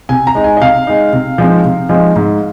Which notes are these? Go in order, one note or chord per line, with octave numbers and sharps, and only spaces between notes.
C3 G#5
A#5
G#3 D#4
G#5
D#5
C3 F5
G#3 D#4
C3
F3 G#3 C4 D#4
C3
F3 G#3 C4 D#4
G#2